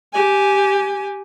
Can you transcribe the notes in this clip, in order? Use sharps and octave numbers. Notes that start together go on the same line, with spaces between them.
G4 G#5